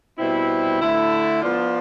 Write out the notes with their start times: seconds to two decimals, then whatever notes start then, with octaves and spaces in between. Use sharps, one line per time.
0.18 B2 G3 C4 E4
0.80 D3 A3 E4
1.42 F3 B3 D4 F4